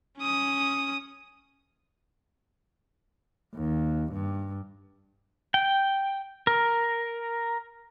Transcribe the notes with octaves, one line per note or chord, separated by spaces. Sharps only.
C#4 D#6
D#2
G2
G5
A#4